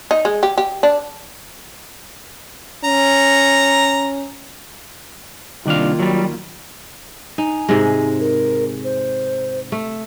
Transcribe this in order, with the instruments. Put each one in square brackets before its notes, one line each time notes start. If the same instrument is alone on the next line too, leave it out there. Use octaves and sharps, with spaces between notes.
[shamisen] D#4
G#3
G4
G4
D4
[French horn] C#4 [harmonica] A#5
[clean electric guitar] C2 D4 F5 [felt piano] D#3 [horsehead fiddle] A#3 F4
[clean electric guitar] F#3 G3
[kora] D#4 [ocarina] G#5
[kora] G#2 C3 G#3
[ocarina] A#4
C5
[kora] A3